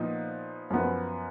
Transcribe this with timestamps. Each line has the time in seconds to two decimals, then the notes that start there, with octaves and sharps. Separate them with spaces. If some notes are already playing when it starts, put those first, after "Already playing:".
Already playing: A#2 F3 B3 D#4
0.70 F#2 F3 B3